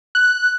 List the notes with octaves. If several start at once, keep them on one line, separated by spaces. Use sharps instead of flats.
F#6